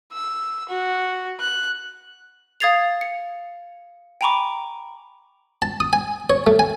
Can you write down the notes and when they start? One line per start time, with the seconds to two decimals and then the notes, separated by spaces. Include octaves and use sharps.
0.12 E6
0.69 F#4
1.40 F#6
2.60 F5 D#6 G#6 A6 C7 F7
3.01 C#7
4.21 G5 G#5 A#5 B5 C#6 D6
5.62 A5
5.80 D#6
5.93 G#5
6.30 C#5
6.47 A3
6.59 G#5